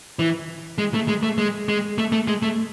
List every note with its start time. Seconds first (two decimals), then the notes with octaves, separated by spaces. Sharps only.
0.19 E3
0.78 G#3
0.94 A3
1.08 G#3
1.23 A3
1.38 G#3
1.68 G#3
1.98 A3
2.12 A3
2.28 G#3
2.43 A3